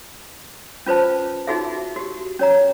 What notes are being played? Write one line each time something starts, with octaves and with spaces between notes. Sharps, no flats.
C#4 F4 B4 C5 A5
D#4 F4 F#4 G#4 E5
F#4 G4
C#4 C#5 A#5